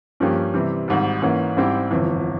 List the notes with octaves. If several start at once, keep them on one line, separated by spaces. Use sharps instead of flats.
G2 F3 A#3 C#4 G4
C3 E3 G3 C4
G#1 G#2 G3
G#2 E3 A#3 C#4
G#2 G3 C4 E4 G4
G1 F2 E3